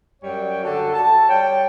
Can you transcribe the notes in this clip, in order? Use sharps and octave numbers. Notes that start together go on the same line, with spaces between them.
F#2 G3 C#5 G5
D3 F#4 A4
A5
G3 C#5 G5